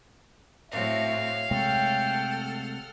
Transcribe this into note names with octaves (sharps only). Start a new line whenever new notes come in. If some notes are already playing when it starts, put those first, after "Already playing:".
A2 C4 F#4 C#5 E5 F5
C3 G#3 A3 A4 F#5 G5 F6